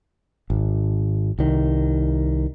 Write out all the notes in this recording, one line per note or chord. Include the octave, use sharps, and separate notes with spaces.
G#1
C2 D#3